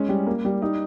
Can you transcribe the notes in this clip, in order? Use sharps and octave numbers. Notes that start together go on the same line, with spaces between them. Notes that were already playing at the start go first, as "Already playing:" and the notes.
Already playing: G#3 C#4
G3
A#3
G3
D#4